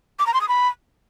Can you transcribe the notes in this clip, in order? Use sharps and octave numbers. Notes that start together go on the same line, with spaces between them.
D6
A#5
C6
D#6
B5